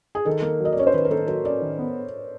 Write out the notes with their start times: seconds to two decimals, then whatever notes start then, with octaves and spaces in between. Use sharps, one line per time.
0.15 G#4
0.25 D#3 A4
0.42 A#3
0.60 F#3
0.65 D#5
0.72 D5
0.77 C#4 C#5
0.87 C5
0.94 D#3 B4
1.05 A#4
1.11 A#3 A4
1.27 F#3 A#4
1.44 C#4 D5
1.62 D#3
1.79 B3